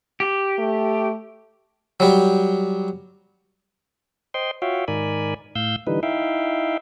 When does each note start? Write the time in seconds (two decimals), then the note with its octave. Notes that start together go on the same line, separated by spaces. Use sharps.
0.20 G4
0.59 A3
2.00 F#3 G3
4.34 C5 D#5 G5 C6
4.62 F4 F#4 C#5 E5 F5 G5
4.88 G#2 D#3 A#4 D5 G#5 B5
5.55 A2 F5 E6 G6
5.87 D3 E3 G3 D#4 B4
6.03 D#4 E4 E5 F5 G5